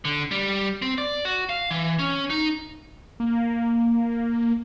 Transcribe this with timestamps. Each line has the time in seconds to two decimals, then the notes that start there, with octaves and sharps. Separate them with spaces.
0.05 D3
0.31 G3
0.82 C4
0.98 D5
1.25 F#4
1.49 F5
1.71 E3
1.99 C#4
2.30 D#4
3.20 A#3